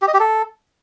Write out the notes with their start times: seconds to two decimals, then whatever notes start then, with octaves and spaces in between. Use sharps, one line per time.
0.02 G4
0.08 D#5
0.14 G4
0.20 A4